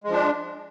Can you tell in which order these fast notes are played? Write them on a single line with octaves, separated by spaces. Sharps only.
G#3 F3 D4